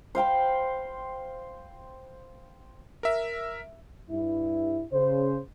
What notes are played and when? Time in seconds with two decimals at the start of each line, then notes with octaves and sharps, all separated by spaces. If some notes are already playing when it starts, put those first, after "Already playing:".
0.15 C5 F5 G5 B5
3.03 A#4 E5
4.11 G2 E4
4.94 C#3 C5